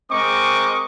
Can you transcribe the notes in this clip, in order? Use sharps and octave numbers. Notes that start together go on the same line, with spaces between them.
G#3 C4 A#4 D#5 C#6 D6